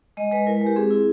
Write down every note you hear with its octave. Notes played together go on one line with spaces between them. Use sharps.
G#3 D#5
G#3 B4
E4 A#4
B4
G#3
G4
C4 G#4
E4